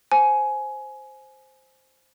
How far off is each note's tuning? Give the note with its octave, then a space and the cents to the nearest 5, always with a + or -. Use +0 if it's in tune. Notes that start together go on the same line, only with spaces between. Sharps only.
C5 +0 G#5 +20